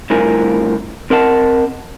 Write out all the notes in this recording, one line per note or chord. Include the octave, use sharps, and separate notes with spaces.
C2 A2 D3 F3 A#4 G#5
C4 A#4 D#5 F#5 A5